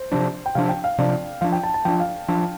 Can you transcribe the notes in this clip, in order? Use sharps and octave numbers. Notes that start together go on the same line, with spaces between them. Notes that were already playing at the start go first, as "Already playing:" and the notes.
Already playing: C5
C3 F3 D4
G5
C3 F3 D4 F5
G5
F5
C3 F3 D4 D5
F3 D4 F5
G5
A5
A5
F3 D4 G5
F5
F3 D4